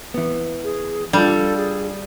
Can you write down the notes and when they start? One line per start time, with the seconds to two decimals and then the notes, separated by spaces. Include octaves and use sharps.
0.14 E3 B3
0.64 G#4
1.13 G3 D4 F4 A4
1.57 G#4